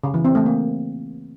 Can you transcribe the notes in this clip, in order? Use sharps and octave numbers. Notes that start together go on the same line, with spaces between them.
C#3
E3
C4
A3
A#3